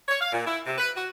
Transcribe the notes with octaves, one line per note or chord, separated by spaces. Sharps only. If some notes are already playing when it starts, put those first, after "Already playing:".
C#5
F5
A#2
E4
C3
B4
F#4